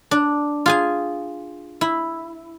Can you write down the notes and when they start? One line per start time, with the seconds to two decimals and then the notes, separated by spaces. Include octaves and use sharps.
0.11 D4
0.66 F4 G#4 G#5
1.81 E4